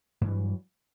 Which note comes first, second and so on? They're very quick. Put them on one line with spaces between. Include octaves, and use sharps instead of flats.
G2 E3 G3 F#3